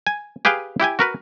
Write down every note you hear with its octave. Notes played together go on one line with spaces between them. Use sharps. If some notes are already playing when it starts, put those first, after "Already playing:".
G#5
G4 G#4 B4 F5 G5
E4 G4 G5 G#5
F#4 A#4 B4